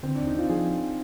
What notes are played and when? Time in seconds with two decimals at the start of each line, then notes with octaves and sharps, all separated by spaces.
0.03 D3 C4
0.15 D#2 D4
0.27 D#4
0.34 C4 F4
0.49 F3 G#4